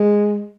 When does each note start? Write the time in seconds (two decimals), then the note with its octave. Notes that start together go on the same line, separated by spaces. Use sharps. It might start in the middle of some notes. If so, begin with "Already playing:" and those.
Already playing: G#3